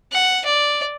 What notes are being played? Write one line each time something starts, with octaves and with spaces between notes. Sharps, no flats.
F#5
D5